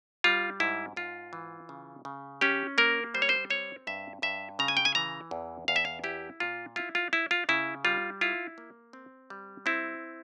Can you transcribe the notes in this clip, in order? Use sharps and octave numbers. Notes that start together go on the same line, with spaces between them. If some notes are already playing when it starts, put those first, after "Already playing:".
G3 F4
G#2 E4
G#2 F4
E3
C#3
C#3
C#4 G4
A#3 A#4
G3 C5
C#5
C5
C4 C#5
G2 E5
G2 E5
C#3 A#5
G#5
G5
G#5
E3 A#5
E2
E2 F5
E5
F5
E4 G4
A#2 F4
E4 F4
F4
E4
F4
C#3 E4
G3 F4
E4 F4
A#3
C4
G3
C4 E4